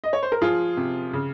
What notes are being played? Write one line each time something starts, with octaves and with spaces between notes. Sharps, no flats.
D#5
C#5
C5
A#4
F3 F4 G#4
C3
C#3